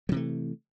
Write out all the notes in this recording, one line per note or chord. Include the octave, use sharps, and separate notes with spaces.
C3 E3 F#3 A3